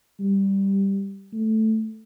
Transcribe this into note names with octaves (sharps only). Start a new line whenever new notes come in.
G3
A3